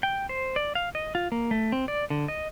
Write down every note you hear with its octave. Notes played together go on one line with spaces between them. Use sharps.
G5
C5
D5
F5
D#5
F4
A#3
A3
C4
D5
D3
D#5